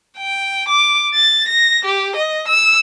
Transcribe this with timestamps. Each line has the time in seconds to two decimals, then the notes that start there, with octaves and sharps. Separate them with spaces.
0.18 G5
0.68 D6
1.14 A6
1.48 A#6
1.85 G4
2.16 D#5
2.48 E6